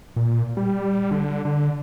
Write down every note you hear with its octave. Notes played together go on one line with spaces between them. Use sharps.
A#2
G3
D3
D3